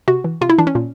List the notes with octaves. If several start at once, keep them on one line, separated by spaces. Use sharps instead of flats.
C3 F#4
E3
C3 F4
E4
E3 D4
C#4
A#2